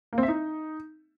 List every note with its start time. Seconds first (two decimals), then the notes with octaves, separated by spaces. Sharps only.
0.13 A#3
0.18 C4
0.23 E5
0.28 D#4